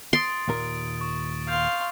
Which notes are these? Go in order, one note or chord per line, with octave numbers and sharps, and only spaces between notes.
C6 D#6 A6 D7
D#2 A#2 A#4
C#6
F5 C6 G6